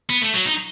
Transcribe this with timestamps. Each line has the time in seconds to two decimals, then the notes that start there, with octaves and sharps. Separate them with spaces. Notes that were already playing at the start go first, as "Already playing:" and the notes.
0.10 B3
0.22 A3
0.34 F#3
0.46 D#4